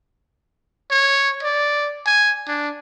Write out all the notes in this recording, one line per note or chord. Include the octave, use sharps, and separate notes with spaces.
C#5
D5
G#5
D4